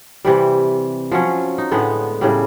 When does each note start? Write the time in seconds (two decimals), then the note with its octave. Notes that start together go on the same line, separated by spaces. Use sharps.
0.25 C3 E3 G3
1.12 F3 F#3 C#4
1.58 D#4
1.71 A2 D3 G#3 B3
2.21 A2 C#3 G3